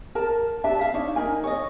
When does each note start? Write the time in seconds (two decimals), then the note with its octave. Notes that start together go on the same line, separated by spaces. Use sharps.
0.15 A#4 A5
0.64 D4 G4 E5 A5
0.79 E5 F5
0.94 D4 D#4 C#5
1.16 D#4 A#4 G#5
1.44 C#5 D#5